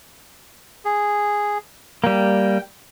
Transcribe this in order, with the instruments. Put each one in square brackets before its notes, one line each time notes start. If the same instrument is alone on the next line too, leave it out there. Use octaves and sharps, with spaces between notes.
[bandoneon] G#4
[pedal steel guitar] G3 A#3 [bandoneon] G5